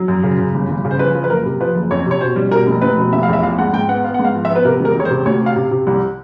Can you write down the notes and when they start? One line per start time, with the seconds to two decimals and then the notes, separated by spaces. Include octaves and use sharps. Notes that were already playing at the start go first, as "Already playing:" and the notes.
Already playing: F#3
0.08 F#2
0.23 C#3
0.38 C#3
0.54 G1
0.69 G1
0.85 C#3
0.91 C5
0.99 F3 B4
1.15 F3
1.24 B4
1.30 F#1 A#4
1.45 C3
1.60 F3 B4
1.75 F#1
1.91 F2 C#5
2.06 C3 C#5
2.21 B2 C5
2.36 G3
2.51 B2 A#4
2.67 F1
2.82 F1 B4
2.97 B2
3.12 F1 E5
3.23 E2 F5
3.33 E5
3.43 F3 F5
3.58 G#2 F#5
3.73 G#2 G5
3.88 B3 F#5
4.04 B3 F5
4.14 F#5
4.19 G#2
4.25 F5
4.35 F3
4.45 E5
4.50 B3
4.56 B4
4.65 C3 A#4
4.80 E1 A#4
4.95 E1 C#5
5.05 C5
5.10 C3
5.26 D2 C#5
5.41 C3
5.46 F5
5.56 C3
5.71 C3
5.87 C2